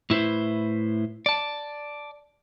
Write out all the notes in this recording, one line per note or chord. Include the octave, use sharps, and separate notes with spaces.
A2 E4 B4 C5
D5 A5